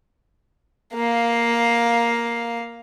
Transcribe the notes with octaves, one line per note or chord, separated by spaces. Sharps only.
A#3 F5